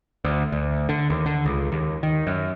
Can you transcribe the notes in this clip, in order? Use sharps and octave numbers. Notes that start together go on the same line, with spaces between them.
D2
D2
D3
D#2
D3
C#2
D#2
D#3
F#2